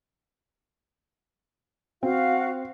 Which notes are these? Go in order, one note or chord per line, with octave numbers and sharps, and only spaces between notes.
C4 F#4 F5